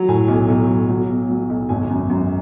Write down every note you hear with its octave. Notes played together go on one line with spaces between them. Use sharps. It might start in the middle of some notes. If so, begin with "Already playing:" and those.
Already playing: F#3
A2 G#5
B1
B1
B1
F#3
B2
F#3
B1
G#1 G#5
F#2
F#2